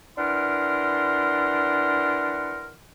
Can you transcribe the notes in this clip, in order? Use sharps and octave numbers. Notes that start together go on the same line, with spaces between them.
E3 D4 A#4 F#5 C6 F6